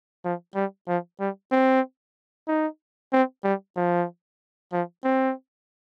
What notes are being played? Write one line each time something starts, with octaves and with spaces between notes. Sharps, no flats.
F3
G3
F3
G3
C4
D#4
C4
G3
F3
F3
C4